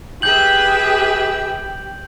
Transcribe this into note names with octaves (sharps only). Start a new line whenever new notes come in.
G4 G#4 B4 E5 G6 F#7